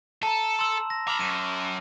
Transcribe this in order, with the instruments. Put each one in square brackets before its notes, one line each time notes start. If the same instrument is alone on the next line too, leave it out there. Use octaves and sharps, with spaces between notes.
[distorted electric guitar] A4 [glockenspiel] A5 A#5
[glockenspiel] C6 E6 E7
A#6
[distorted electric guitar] A#5 B5 [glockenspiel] D6 F6 E7
[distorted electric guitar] F#2 [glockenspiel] D#7 E7